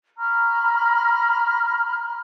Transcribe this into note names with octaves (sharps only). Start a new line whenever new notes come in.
A#5 B5 C#6 F6